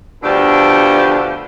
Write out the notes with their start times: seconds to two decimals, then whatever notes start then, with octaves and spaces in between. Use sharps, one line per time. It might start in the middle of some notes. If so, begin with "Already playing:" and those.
0.23 B2 D3 F3 A3 D4 G4